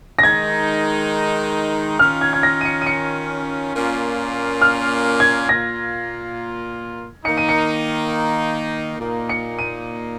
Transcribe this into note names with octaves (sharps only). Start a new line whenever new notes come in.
A#6
D#3 G#3 D#4 G#6
D#3 C#4 F4 F6
G#6
G#6
A#6
D#7
C#7
D#7
C#7
A#2 A#3 C#4 F4
F6
G#6
A#2 A#3 F4 A#6
D#3 A#3 D#4 C#7
D#7
C#7
A#2 A#3 D#4
C#7
D#7